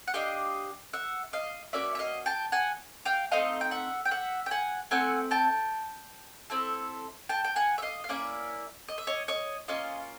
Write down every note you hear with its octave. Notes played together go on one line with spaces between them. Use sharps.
F#5
D4 G4 D#5 F5
E5 F#5
D#5 F5
A#3 C#4 F#4 D5 E5
E5
D#5 F5
G5 A5
F#5 G#5
F5 G5
A3 C4 D#4 D#5 F5
G5
E5 F#5
G5
E5 F#5
G5
F#5 G#5
A3 C4 E4 F#5 G#5
G5 A5
C4 E4 A4
G5 A5
G5
F#5 G#5
E5
D#5 F5
F5
A#3 C#4 E4 D5 E5
D#5
E5
C#5 D#5
C#5 D#5
A#3 C#4 F4 D#5 F5